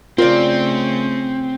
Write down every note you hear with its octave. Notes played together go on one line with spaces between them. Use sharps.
C#3 A3 C4 C#4 F4 A#4 D5